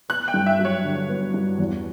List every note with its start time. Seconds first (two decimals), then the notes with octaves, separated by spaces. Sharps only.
0.09 B3 F#6
0.28 G5
0.34 G2
0.46 E5
0.59 F#3
0.65 C#5
0.84 D3
1.09 B3
1.34 G2
1.58 E2